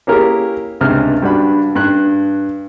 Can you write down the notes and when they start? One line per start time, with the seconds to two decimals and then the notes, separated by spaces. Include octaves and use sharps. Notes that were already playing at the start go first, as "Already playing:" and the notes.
0.07 A#3 C#4 E4 G4 G#4 A#4
0.81 C#2 G2 C3 C5 F6
1.22 G2 G3 D4 F#4 B5
1.75 G2 F#6